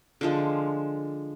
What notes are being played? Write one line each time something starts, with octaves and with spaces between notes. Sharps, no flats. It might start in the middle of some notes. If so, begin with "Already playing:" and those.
D3 F3 G#3